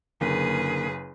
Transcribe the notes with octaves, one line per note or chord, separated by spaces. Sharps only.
F#1 D3 A#3 G#4 A#4 B4